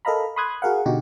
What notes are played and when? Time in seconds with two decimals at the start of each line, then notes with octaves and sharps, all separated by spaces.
0.05 A4 A#4 D#5 F5 A#5 B5
0.36 B5 C6 D#6 F#6 G#6
0.62 F#4 G#4 A#4 F5 F#5
0.86 B2 D3 D#4 F#4 G4